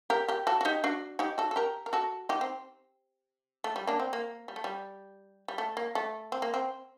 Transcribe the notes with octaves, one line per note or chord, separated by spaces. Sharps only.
G4 A#4
G4 A#4
F#4 A4
F#4
D#4 G4
D4 F#4
D#4 G4
F#4 A4
A4
G4 A#4
A#4
F#4 A4
D#4 G4
C4
A3
G3
A#3 D4
C4
A#3
G3
A3
G3
G3
A3
A#3
A3
C4
A#3
C4